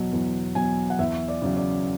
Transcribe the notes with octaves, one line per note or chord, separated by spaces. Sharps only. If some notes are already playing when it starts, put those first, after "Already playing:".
Already playing: E2 B2 F#3
E2
B2 F#3 G#5
F#5
E2 E5
D5
C#3 F#3
D5